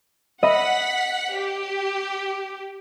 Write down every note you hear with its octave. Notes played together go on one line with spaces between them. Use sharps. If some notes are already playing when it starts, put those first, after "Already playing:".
D#5 E5 F#5 B5 B6
G4